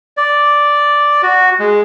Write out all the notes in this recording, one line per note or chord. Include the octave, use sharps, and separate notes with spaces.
D5
F#4
G#3